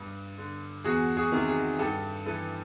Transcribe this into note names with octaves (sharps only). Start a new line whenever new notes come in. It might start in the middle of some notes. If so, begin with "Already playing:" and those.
Already playing: G2
D3
E2 F#4 G#4
F#4 G#4
C3 D#3
F#4 G#4
G2 G4 A4
E3 A4 B4